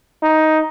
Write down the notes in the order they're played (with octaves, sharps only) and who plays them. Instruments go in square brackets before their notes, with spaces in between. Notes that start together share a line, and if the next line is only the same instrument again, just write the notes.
[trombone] D#4